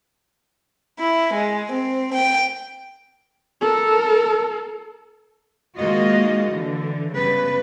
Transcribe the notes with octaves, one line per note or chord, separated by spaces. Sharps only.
E4
G#3
C4
G5
A4 A#4
D#3 G#3 A#3 F4 F#4 D#5
D3 E3
C#3 G3 B3 B4